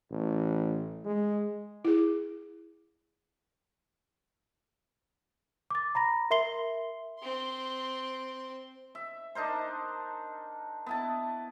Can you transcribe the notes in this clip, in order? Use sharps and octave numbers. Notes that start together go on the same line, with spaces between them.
A1
G#3
E4 G#4
D6 A6
A#5 B5 A#6
A#4 E5 C6 C7 G7
C4 C6
E5
D4 D#4 A#4 C5
B3 E4 A5